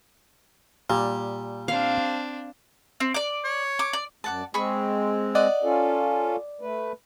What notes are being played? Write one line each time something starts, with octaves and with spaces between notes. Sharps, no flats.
A#2 G3
C4 D4 F5
C4
D5 D6
C#5
D6
D5
F#2 D5 F#5 A5
G#3 C4 G#4 B5 C#6
D5 D#5 F#5
C#4 F4 A4
A3 B4